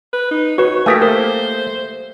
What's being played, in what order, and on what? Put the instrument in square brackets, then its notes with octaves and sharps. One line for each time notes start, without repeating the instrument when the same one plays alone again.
[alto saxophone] B4
D#4
[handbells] F#4 B4 [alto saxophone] C#5
[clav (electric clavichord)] A3 A#3 G4 [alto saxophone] E4 [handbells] G#5 D#6 B6
[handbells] A#4 [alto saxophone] C5